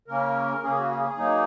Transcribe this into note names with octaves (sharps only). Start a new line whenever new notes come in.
C#3 A#3 C#4 A#4
C#3 A#3 C#4 G#4
F#4
G#4
G#4
F#3 A#3 D#4